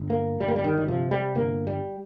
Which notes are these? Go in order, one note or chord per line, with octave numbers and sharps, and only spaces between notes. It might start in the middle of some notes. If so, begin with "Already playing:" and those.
Already playing: G1
A#3
G1 G3
A#3
G3
D#3
G3
C3 F3
G3
G1 A#3
G3